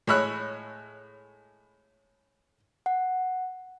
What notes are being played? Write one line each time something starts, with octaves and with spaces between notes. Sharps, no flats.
A2 G#3 C#5 B5 E6 F#6
F#5